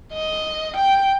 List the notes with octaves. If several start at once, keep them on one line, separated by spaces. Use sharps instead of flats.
D#5
G5